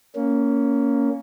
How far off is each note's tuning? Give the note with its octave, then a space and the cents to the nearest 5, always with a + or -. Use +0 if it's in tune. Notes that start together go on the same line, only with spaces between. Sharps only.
A#3 -5 C#4 +10